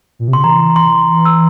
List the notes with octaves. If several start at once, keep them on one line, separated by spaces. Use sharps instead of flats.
A#2
C3
C#3 C6
E3 A#5
C6
E6